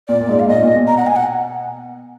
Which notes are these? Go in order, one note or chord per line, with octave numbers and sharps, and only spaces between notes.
A#2 D5
A#2
G#2
F5
A#2 D#5
A#2
B2
A#5
F#5
G#5
F#5